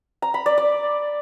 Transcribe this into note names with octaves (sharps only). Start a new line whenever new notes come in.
A#5
B5
D5
D5